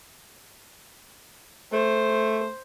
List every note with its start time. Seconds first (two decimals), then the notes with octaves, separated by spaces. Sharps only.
1.73 A3 C5